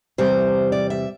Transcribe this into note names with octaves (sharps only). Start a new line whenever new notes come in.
E2 C3 G3 C5
D5
E5